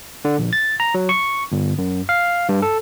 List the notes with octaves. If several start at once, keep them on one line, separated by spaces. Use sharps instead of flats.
D3
A#1
A6
A#5
F#3
C#6
G1
F#2
F5
G2
A4